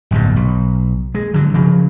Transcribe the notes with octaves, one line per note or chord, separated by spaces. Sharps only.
D1 B1 G2 A#2
B1
G#3
D3 F#3
C#3 F3 F#3 G#3